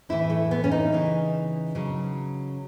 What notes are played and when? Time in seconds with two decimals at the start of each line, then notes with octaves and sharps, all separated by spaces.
0.09 A2 E3 E4
0.30 A3
0.51 B3
0.64 C#4
0.71 D#4
0.92 C#3 E3
1.75 C#3 F#3